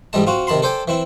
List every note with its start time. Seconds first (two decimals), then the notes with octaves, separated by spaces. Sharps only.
0.13 A1 G#2 G3 G#3 A5
0.27 C4 F4 F#4
0.47 C3 D#3 A5 B5 C6
0.62 A4 C5 D5 G5 G#5
0.88 E3 C4 E4